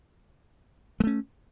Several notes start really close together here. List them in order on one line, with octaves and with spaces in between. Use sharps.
G#3 A3 C#4